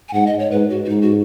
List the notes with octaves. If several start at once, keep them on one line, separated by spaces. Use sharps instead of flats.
G#5
G#2 F#5
D#5
C#5
G#2 B4
F#4
F#4
G#2 D#4
F#4